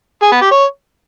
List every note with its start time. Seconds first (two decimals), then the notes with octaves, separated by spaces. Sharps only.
0.22 G#4
0.32 B3
0.42 G4
0.51 C#5